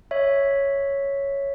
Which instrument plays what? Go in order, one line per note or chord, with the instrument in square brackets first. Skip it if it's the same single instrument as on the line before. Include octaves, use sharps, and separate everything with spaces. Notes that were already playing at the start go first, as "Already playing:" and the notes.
[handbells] C#5 E5